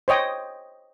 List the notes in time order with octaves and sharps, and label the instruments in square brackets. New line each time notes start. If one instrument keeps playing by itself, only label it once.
[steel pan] C5 C#5 D#5 G5